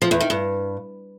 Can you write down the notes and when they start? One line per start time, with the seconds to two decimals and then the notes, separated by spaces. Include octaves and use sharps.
0.02 F3
0.11 E2
0.20 D#3
0.30 G2